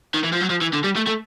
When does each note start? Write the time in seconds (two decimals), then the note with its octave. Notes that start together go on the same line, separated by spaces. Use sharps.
0.14 D#3
0.24 E3
0.33 F3
0.41 F#3
0.50 F3
0.61 E3
0.73 D3
0.84 G3
0.96 A3
1.07 A3